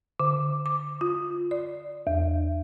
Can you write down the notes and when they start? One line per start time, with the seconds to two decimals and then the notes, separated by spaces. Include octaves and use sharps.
0.20 D3
0.66 D6
1.01 F4
1.51 D5
2.07 E2